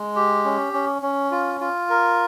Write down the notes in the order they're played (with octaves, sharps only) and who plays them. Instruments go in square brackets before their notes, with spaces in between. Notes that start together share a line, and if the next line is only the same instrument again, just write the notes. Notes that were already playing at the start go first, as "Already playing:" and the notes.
Already playing: [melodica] G#3
G4
C#4
C#4
C#4
F4
F4
A#4